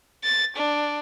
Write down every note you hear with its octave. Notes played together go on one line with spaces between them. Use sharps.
A6
D4